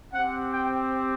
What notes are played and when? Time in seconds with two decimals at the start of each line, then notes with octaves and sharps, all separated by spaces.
0.13 C4 G4 F#5
0.52 G5